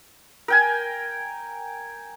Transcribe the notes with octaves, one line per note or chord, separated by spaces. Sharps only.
A#4 G5 G#5